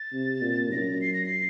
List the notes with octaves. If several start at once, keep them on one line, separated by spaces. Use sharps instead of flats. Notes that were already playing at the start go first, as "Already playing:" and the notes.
Already playing: A6
C3
A#2
F#2 A#6
C7
A#6
C7